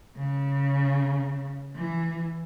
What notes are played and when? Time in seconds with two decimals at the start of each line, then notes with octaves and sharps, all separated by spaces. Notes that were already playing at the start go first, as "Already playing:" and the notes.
0.17 C#3
1.75 E3